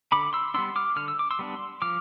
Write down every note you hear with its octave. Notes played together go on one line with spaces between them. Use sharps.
D3 B5 D6
C6 E6
G3 B3 D4 C6 E6
D6 F6
D3 F6
E6
D6
C6 E6
G3 B3 D4
F3 D6 F6